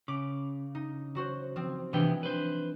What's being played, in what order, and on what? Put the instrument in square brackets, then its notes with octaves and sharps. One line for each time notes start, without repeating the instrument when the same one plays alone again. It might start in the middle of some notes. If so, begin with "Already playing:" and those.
[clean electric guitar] C#3 [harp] D6
[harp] D#4
F#3 F#4 C5
F3 C4
[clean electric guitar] C3 B3 G5 [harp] E3 G#3 D4
[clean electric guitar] B4 C5